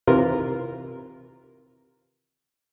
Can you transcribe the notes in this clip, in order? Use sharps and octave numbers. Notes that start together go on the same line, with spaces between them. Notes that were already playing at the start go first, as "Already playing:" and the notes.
C3 D#3 E3 F4 A#4